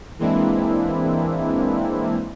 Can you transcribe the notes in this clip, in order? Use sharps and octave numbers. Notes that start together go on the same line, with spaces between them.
E3 G#3 A#3 C4 D4 E4